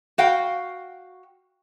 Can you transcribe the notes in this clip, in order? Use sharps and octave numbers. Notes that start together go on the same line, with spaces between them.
F#4 F5 G5